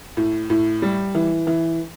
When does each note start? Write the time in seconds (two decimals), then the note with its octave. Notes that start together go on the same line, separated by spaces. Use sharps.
0.17 A2
0.50 A2
0.82 G3
1.15 E3
1.47 E3